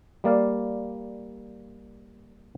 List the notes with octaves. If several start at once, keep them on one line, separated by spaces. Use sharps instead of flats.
G3 A#3 D5 F5